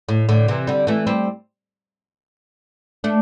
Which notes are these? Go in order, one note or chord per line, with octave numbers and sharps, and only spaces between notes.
A2
A2 D3
C3 E3
D3 G3
E3 A3
G3 C4
A3 D4